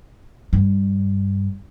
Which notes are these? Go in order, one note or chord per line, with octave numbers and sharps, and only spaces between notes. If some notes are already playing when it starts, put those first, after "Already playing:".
G2